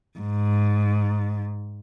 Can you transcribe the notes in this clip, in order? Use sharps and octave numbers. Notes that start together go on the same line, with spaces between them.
G#2